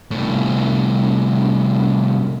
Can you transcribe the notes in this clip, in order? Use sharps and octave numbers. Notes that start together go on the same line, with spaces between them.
C2 A2